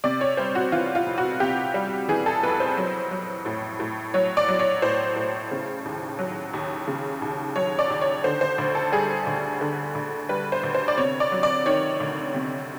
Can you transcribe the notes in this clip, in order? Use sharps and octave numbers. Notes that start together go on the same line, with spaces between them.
C3 D5
C#5
G3 C5
F#4
E3 F4
F4
F2
F#4
C3 G4
G3
E3 G#4
A4
F2 B4
C5
F#3
F#3
A2
A2
F#3 C#5
D5
F#3
C#5
A2 C5
A2
C#3
D#2
F#3
D#2
C#3
D#2
F#3 C#5
D5
D#2
C#5
D3 C5
C5
D2
A4
G3 G#4
D2
D3
D2
G3 B4
C5
D2
C5
D5
C3 C#5
D5
F#3
D5
D#3 C#5
D2
C3